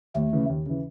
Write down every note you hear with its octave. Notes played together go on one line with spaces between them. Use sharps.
D#2 A3
C#3 E3
D#2
C#3 E3